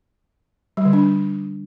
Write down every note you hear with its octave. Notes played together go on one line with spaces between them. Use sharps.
G3
D3
D4